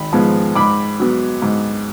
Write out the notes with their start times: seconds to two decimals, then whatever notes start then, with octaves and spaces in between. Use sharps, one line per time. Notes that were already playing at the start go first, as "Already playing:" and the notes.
Already playing: G#1 B5
0.13 G#2 F3 G#3 B3
0.55 G#2 B5 D6
1.00 F#3 B3
1.42 G#2